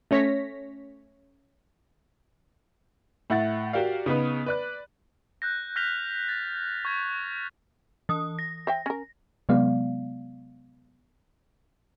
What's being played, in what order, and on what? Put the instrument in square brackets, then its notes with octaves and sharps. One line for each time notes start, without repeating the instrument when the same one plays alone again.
[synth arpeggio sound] A3 C#4 C#5 A#6 B6
[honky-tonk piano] A2 E4 F#5 A6
F#4 G4 A#4 D5 F5
C#3 B3 D#4 B4
B4 D5 F#6
[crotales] F#6 G6 A#6
F6 G6 A#6 B6 F7 G7
A6
C#6 G#6
[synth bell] E3 D#6
A#6
[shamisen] C5 E5 G5
C#4 A#4
[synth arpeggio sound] C3 F#3 G#3 B3 D5 F5